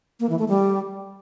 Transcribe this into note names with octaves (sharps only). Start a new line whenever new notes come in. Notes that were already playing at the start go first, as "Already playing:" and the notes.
A#3
E3
A3
G3